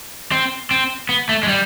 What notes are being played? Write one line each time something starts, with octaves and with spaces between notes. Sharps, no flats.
C4
C4
B3
A3
G#3
G3